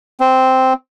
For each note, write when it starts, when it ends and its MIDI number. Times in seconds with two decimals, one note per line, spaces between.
0.20 0.73 60